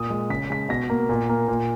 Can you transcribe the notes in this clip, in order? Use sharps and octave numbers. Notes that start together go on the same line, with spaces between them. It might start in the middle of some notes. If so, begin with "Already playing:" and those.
Already playing: A#2 D#6
G#3
C#3 B6
G#3 B6
B2 A#6
A#3
A#2
A#3
A#2